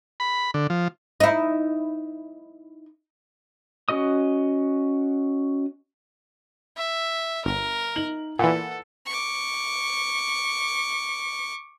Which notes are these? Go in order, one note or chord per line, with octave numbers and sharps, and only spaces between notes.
B5
D3
F3
D#4 E4
C#4 F#4 D#5 D#6
E5
G1 A#4
D#4 F#7
A#2 E3 A4 F#5
C#6 D6